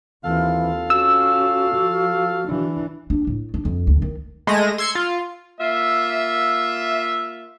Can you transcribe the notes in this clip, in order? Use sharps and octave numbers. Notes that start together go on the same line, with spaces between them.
D#2 E3 C4 F4 A4 F5
C#4 F#4 E6
F3
E3 D4
D4
A2
D4
F2
D2
D#3
G#3 A3 A#6 D#7
C6 E6 G#6 C7 C#7
F4
A#3 F4 E5